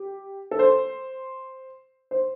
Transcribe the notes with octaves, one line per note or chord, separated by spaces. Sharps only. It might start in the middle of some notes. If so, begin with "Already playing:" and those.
Already playing: G4
A4
C5
C5